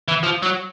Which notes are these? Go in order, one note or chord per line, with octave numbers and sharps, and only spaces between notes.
E3
F3
F#3